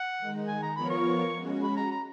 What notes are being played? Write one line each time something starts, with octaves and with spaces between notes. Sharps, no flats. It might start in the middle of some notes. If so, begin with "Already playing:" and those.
Already playing: F#5
D#3 G#3 D#4
G#5
A#5
F3 B3 F4 A#4 C#5 B5
C#6
G#3 C#4 F#4
B5
A#5
A#5